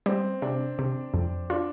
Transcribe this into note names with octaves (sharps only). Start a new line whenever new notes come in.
G3 C4
C3 D4
C3
F2
D4 F4